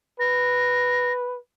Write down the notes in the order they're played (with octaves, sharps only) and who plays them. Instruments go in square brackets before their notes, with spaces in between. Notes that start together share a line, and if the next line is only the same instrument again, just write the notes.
[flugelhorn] B4 [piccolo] A#6